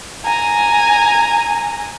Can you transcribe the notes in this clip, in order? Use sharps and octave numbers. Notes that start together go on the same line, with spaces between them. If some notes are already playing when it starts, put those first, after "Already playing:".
G#5 A#5